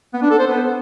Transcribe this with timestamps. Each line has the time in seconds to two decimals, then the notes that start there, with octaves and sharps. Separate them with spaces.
0.14 B3
0.22 D4
0.30 A4
0.39 C5
0.47 B3